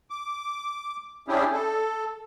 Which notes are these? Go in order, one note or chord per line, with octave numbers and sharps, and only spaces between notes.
D6
C#4 D4 E4 G4 G#4
A4